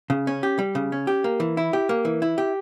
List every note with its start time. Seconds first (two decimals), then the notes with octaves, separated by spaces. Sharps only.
0.10 C#3
0.27 C#4
0.43 G4
0.59 G3
0.75 C#3
0.92 C#4
1.07 G4
1.24 A#3
1.40 E3
1.57 E4
1.73 G4
1.89 A#3
2.05 E3
2.22 E4
2.38 G4